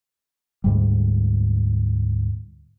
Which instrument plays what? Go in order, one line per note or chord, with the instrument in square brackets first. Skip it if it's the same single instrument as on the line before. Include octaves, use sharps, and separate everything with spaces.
[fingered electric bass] D2 G#2 G3